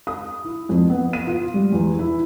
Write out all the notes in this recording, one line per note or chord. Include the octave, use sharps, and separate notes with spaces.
D#6
E4
F2
B3
D#7
F4
G3
E2
E4